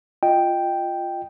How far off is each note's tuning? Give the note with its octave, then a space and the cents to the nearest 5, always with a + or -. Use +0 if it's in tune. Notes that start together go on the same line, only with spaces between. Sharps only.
F4 +0 D#5 +0 G5 +0